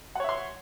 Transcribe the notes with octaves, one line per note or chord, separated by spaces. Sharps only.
C#5 E5 F#5 C6